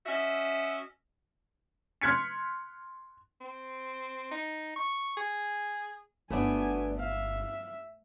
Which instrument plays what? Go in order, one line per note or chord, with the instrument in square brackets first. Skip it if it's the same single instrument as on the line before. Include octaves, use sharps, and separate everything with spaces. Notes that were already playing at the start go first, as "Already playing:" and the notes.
[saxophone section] C#4 F#4 D#5 E5
[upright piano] C6 F6 F#6 G#6 B6 C#7
[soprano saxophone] C4
D#4
C#6
G#4
[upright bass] G1 [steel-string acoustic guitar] A3 B3 D4 [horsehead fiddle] F#4 G#5
[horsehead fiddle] E5 [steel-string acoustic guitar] F5